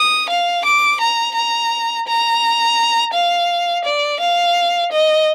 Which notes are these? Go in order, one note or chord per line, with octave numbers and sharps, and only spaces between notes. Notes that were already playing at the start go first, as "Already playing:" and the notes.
Already playing: D#6
F5
D6
A#5
A#5
A#5
F5
D5
F5
D#5